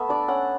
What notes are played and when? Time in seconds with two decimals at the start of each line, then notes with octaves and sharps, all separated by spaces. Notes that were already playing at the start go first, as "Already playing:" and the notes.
Already playing: A3 B3 E5
0.09 D4 D5
0.28 C#4 F#5